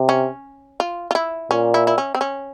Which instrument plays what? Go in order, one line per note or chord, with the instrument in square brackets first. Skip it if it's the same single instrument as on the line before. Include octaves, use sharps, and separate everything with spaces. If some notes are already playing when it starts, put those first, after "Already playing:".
Already playing: [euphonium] C3
[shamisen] C#4
F4
F4
E4
[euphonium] A#2 [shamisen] C#4
[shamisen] E4
E4
C#4
C4
C#4